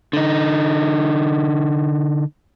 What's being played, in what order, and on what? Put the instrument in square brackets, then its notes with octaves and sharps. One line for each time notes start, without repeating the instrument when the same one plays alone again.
[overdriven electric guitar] D3 D#4